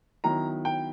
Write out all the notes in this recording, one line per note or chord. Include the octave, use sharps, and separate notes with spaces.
D#3 F#3 B3 E4 A#5
G5